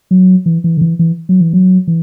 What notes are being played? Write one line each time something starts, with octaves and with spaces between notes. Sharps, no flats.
F#3
E3
E3
D3
E3
E3
F#3
E3
F#3
E3